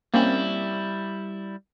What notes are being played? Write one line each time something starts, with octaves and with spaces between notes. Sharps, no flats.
G3 A#3 C4 C#4 E4